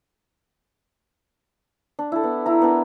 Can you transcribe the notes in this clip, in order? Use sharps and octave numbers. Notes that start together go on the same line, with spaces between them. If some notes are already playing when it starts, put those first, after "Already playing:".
D4
E4 A4
B3
E4 A#5
B3 D4 A#4